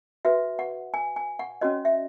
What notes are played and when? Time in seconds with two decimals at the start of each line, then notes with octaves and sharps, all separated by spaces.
0.25 F#4 B4 E5
0.59 F#5
0.94 G#5
1.16 G#5
1.39 F#5
1.61 C#4 F#4 C#5 D#5
1.85 E5